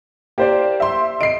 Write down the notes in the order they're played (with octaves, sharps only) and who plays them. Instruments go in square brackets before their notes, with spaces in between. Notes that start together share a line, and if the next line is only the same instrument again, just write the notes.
[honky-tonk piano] A#3 [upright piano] G4 C5 D5
[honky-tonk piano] E5 C6
[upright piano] D#5 [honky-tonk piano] C7 D7